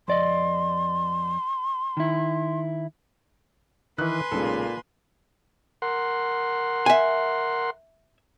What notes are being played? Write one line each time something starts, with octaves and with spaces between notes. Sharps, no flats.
F2 D5 D#5 C6
D#3 E4
D#3 E3 B4 G#5 C6 F#6
B1 A#2 C#3 G#3 A4
A#4 F#5 C6
E5 G#5